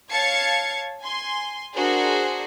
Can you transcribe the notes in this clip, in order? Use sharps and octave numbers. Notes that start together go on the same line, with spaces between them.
C#5 F5 A5 G#6 C#7
G#5 C6
D4 F#4 G#4 A#4 C5